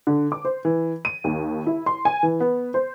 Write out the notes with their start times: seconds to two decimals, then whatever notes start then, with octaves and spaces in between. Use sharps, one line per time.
0.07 D3
0.32 D6
0.45 C5
0.65 E3
1.05 D#7
1.24 D#2
1.66 E4
1.86 C6
2.05 G#5
2.23 E3
2.40 B3
2.74 C5